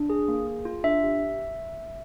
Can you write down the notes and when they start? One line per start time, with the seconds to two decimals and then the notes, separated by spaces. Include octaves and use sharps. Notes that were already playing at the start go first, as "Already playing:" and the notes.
Already playing: D4
0.10 G#4
0.28 A#3
0.47 G#4
0.65 F4
0.84 D4 E5
1.03 G4